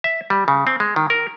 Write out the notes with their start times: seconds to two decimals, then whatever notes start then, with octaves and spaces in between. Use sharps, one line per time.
0.04 E5
0.30 G3
0.48 C#3
0.67 C4
0.80 G#3
0.96 D#3
1.10 A#4